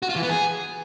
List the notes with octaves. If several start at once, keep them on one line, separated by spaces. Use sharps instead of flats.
F#4
F4
E3
B3
G#4